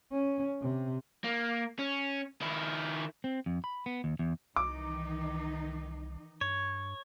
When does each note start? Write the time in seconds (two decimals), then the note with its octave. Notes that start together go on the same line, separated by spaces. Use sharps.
0.12 C#4
0.62 C3
1.24 A#3
1.79 C#4
2.41 D#3 E4
3.24 C4
3.46 F2
3.64 B5
3.86 B3
4.04 D#2
4.19 E2
4.56 C2 D#3 E3 D#4 D6
6.41 G2 C#5